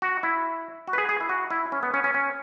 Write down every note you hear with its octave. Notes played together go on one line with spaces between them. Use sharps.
F#4
E4
F#4
B4
G#4
G#4
E4
F#4
E4
C#4
B3
C#4
C#4
C#4